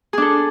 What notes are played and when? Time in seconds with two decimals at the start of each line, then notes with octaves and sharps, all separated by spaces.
0.13 G#4
0.18 D4
0.22 A4